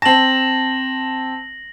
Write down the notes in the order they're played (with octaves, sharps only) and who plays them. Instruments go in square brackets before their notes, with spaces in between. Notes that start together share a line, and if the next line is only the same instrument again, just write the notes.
[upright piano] C4 A5 [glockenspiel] A#6 F#7